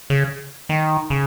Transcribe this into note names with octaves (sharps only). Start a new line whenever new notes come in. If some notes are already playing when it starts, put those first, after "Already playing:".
C#3
D#3
C#3